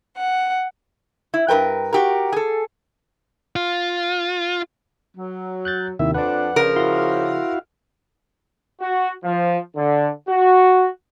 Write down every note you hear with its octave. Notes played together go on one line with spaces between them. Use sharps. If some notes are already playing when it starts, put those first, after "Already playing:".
F#5
E4
G2 A#4 B4 G5
F#4 G4 A#4
G#4 A4
F4
F#3
F#6 G6 A6
D#2 C3 D#3 E4 E5
F2 F3 D4 B4 D5 F#5
C#3 F3 A#4
E4 F#4 F5 C6 A#6
F#4
F3
D3
F#4